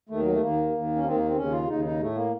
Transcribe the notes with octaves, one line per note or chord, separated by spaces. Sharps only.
D#2 D#3 A3
F#3
A3
D#2 D#3 A#3
D#2 D#3
C#4
D#2 D#3 C4
A#3
C4
D#2 C#3 C#4
F4
D#2 C#3 D#4
D#4
A2 A3
A#3